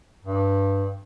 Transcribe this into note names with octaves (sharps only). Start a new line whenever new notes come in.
G2